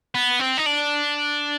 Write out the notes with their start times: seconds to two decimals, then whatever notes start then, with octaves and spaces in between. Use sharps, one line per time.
0.15 B3
0.40 C4
0.58 D#4
0.66 D4